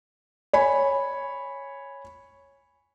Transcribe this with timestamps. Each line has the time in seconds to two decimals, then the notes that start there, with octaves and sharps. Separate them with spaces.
0.53 C#5 G#5 B5